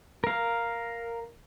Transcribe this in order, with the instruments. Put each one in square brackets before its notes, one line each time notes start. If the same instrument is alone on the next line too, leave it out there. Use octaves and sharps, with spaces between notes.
[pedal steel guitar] A#4 F5